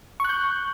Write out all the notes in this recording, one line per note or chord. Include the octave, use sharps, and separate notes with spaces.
C#6 F#6 G6